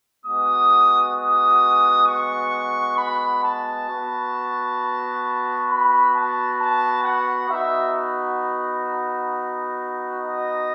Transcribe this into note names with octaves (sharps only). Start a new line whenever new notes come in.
G#3 B3 F#4 D#6
D#6
C#6
B5
A5
B3 F#4
B5
A5
A5
F#5
B3 D#4 F#4 E5
D#5